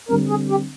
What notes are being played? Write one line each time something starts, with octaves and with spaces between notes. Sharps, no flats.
D3 G3 C4 A#4
G#4
G4